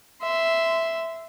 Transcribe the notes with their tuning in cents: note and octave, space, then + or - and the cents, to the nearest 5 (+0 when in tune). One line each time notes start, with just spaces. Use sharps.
E5 +0 C6 -20